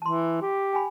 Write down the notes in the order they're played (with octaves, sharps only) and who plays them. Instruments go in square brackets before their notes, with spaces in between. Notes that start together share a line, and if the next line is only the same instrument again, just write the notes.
[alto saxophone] E3 [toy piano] A5 C6
[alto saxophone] G4
[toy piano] G5 G#5 B5